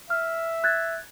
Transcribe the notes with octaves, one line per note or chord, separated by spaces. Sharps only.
E5 F6
F#6 G#6 A6